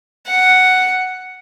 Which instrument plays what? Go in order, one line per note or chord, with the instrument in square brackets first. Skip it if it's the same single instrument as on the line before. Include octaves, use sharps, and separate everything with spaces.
[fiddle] F#5